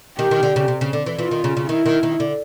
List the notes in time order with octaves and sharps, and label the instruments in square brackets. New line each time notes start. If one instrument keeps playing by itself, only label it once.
[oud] D#3 [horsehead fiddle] G4
[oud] D#3
D3
C#3
C3
C#3
D3
E3
[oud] E3 [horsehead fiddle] F4
[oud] D#3
C#3
C#3
[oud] D#3 [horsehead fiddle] E4
[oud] D#3
D#3
D3